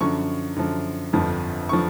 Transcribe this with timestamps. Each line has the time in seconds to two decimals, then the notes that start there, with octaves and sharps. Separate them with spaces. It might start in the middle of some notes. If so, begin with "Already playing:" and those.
0.01 F#2 D3 F3 C#6
0.56 F#2 D3 F3
1.13 G1 F2 D3 F3
1.69 D3 F3 C#6